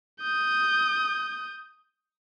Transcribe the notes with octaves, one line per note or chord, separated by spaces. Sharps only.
D#6 G6